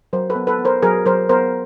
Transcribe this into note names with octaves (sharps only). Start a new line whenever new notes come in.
F#3 A#4 C5
A4 B4
B3
A4 B4
B3
A#4 C5
F#3 G#4 A#4
F#3 A#4 C5
B3 A#4 C5